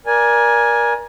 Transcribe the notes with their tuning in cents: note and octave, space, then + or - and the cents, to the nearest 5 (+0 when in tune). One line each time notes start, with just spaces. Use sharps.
A#4 +25 D5 +0 G#5 +0